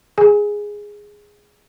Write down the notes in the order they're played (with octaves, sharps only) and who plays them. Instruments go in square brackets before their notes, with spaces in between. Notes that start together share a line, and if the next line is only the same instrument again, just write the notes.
[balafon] G#4 G#5